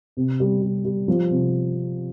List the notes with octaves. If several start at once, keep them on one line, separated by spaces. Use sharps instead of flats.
C3
G3
G3
G3
F3
C3